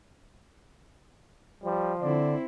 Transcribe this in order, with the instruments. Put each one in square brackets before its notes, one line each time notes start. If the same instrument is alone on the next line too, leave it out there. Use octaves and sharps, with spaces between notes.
[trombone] F3 [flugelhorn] G3
[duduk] D3 [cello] C4 E4 [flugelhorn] D5